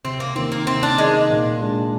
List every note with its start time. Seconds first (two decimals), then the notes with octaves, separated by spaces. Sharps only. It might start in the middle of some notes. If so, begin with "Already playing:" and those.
0.04 C3 C4
0.20 A#3
0.36 D#3 A#3 C4 D#4
0.52 A#3
0.67 C3 C4
0.83 D4
0.98 D#3 G#3 A#3 D#4
1.30 A#2
1.61 G#3 D4